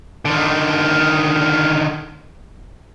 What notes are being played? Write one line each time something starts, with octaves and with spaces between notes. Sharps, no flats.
D3 D#3